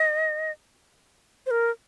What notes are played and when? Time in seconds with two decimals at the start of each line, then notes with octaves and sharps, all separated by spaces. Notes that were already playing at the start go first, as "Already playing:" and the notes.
Already playing: D#5
1.46 C5
1.51 A#4